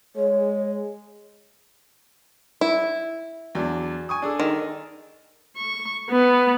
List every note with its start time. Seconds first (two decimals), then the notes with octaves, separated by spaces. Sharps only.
0.16 G#3 C#5
2.61 E4
3.55 E2 F#3 D4
4.09 G#5 C#6 D#6
4.22 D4 G#4 A4
4.40 D#3
5.57 C#6
6.10 B3